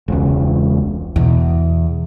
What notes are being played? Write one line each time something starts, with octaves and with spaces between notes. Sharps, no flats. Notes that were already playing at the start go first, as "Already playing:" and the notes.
E1 C#2
E2 B2